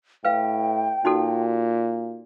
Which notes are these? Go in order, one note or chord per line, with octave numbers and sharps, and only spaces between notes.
A2 B4 F5 G5
A#2 D#4 F#4 A4